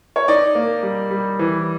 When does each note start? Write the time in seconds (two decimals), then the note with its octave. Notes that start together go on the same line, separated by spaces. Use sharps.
0.16 C#5
0.28 D#4 D5
0.55 A#3
0.83 G3
1.10 G3
1.39 E3